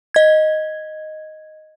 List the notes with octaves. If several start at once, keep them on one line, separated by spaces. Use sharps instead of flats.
D#5 G#6